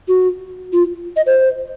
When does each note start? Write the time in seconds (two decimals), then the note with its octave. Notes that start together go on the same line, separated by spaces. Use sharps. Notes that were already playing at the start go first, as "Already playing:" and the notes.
0.08 F#4
0.73 F4
1.16 D#5
1.26 C5